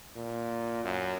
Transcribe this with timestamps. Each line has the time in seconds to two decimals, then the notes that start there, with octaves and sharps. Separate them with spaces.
0.16 A#2
0.84 F#2